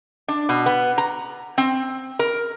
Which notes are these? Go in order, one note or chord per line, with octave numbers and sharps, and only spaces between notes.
D4
B2
B3
A#5
C4
A#4